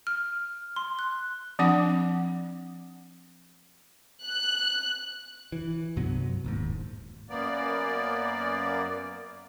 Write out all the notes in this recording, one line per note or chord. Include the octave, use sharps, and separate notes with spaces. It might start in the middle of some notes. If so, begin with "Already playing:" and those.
F6
C6
F#6
F3 C4 D4 F#5 D6
F#6
E3
C2 G2 F#3 B3
D#1 D#2 G#2
F#2 A#3 B3 D5